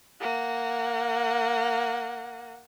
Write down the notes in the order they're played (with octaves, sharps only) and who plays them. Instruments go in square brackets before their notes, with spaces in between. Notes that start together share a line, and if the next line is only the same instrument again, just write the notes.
[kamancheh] A#3 F#5